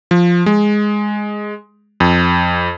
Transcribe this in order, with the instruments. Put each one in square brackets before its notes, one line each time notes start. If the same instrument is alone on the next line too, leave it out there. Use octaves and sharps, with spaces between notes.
[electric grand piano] F3
G#3
F2